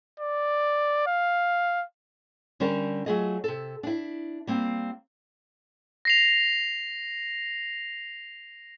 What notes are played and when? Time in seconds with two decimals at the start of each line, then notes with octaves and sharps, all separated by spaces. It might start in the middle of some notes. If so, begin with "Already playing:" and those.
0.19 D5
1.07 F5
2.60 D3 G3 C#4 D4 A#4
3.06 F#3 A3 F4 G#4 D#5
3.44 C3 A4
3.83 D4 E4
4.47 G3 A#3 C4
6.05 A#6 C7 F7